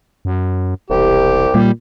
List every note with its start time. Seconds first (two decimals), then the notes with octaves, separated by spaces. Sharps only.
0.25 F#2
0.90 E1 C2 G4
1.54 A#2 G3